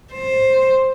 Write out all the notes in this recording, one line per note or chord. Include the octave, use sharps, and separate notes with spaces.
C5